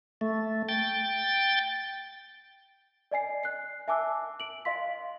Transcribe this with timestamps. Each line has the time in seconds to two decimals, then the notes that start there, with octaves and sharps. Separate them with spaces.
0.21 A3
0.69 G5 A6
3.11 D5 D#5 G#5 C7
3.43 F#6 C7
3.88 E5 G#5 A5 D6 E6 F#6
4.40 D7 F#7
4.65 D#5 F5 C6 B6